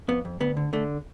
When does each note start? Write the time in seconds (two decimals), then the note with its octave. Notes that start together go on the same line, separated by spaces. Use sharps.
0.08 F2 B3
0.25 F2
0.40 D2 B3
0.57 D3
0.73 D3 A3